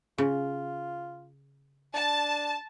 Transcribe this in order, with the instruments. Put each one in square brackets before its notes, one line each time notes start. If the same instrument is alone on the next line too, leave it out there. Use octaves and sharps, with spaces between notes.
[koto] C#3 [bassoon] F4
[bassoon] D4 [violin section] A5